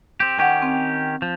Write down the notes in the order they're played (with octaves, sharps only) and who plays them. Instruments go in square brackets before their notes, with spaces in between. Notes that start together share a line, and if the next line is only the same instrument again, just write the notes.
[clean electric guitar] C4 G4
[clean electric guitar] D#3 C#4 G4 [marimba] F#5 G5
[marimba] C4
[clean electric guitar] F3